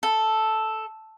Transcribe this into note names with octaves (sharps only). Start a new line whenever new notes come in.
A4